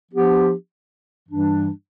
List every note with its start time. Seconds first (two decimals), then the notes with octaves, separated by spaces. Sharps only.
0.11 F3 B3 D4 G4
1.28 G2 E3 G3 D4